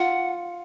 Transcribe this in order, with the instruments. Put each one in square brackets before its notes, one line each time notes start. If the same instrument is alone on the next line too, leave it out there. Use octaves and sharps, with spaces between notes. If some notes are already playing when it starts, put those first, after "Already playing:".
Already playing: [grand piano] F4 [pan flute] F#5